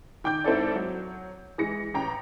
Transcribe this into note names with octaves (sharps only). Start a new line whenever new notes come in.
D#3 G5 D6 G6
G#2 C4 E4 A4 D5
F#3 C#5
E3 G#3 A#6 C#7
A1 G5 A#5